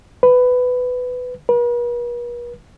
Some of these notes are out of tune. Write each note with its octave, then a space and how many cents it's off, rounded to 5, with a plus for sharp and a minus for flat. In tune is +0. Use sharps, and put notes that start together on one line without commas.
B4 +15
B4 -45